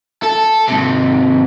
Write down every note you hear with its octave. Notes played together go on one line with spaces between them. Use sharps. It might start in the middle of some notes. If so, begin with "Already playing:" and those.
A4
G#2 C3